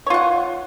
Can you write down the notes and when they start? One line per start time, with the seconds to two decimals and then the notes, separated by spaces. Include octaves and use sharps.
0.06 C#5
0.10 F4
0.14 F#5